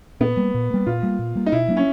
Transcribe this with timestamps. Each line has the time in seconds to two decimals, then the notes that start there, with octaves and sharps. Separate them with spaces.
0.20 A#2 B3
0.37 G3 A#3
0.54 A#2
0.70 G3 A#3
0.86 A#2 F4
1.03 G3 A#3
1.19 A#2
1.35 G3 A#3
1.46 D#4
1.52 B2 E4
1.68 F#3 A#3 D4
1.77 C#4